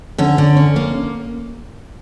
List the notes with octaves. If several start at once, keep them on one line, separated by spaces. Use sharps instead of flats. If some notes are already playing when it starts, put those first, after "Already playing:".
D3 C#4
D3
C#4
A#3